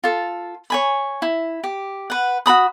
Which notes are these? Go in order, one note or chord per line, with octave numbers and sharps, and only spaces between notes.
F4 A4
C#5 G#5 B5
E4
G4
B4 F#5
F#4 A4 B5 D#6